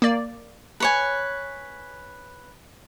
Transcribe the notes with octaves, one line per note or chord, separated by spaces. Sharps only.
A#3 D5
B4 C#5 G#5